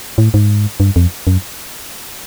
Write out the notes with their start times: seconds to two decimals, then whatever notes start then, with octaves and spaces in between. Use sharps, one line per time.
0.18 A2
0.34 G#2
0.80 G2
0.96 F2
1.27 F#2